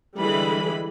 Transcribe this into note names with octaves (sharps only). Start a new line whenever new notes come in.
D3 E3 G3 G#3 B5